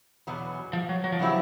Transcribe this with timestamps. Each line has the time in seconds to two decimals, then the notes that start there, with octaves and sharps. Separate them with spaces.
0.27 E2 B2 F#3
0.73 F3
0.89 F#3
1.04 F#3
1.12 F3
1.19 C#3 E3 F#3 G3 C4 E4